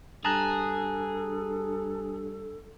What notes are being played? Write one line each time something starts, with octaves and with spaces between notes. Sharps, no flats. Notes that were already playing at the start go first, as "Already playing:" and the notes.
G2 G#4 A4 A5 A#5 F#6